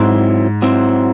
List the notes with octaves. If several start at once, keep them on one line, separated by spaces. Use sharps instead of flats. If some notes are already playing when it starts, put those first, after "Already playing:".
Already playing: G#2 F#3 C4 E4 C5
F#3 C4 E4 C5